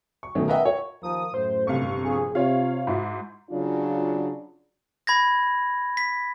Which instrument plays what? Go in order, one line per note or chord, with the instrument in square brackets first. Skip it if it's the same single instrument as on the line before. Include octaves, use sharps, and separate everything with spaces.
[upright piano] C#6
B2 D#3 F#3 A3 C#4
A#4 B4 D#5 E5 F#5 G5
C#5
[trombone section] D#2 F3 A#4 [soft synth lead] D#6
[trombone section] F#2 A2 [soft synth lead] C5
[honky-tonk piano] G1 C3 F5 [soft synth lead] C#6
[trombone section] A#1 G#4
[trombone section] C3 [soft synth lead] F4 [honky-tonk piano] C#5 F5
[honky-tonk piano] G#2 E4 F#4
[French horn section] C#3 F#3 D4 F4
[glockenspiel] B5 G#6 A#6
B6